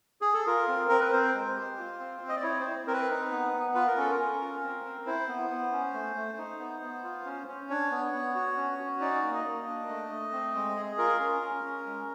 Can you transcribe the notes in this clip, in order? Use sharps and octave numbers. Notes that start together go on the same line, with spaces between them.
G#4
A4
F4 A#4
C4
C4 A#4
B4
C4 C5
G#3
G4
F4
C4
C4
D#5
D5
E4 C#5
C5
C4
C4 A#4
B4
D#4
B3
B3
F4 B4
A#4
C#4 A4
A#4
C#4
F4
C4
C4
E4 C5
B3
B3
C#4
A3
A3
D#4
B3
B3
F4
C#4
C#4
D4 C#5
B3
B3
F#4
C#4
F#4
D#4 D5
A#3
D#5
A#3
D4
A3
A3
C4
G#3
G#4
F4 A#4
C#4
C#4
C#4
G#3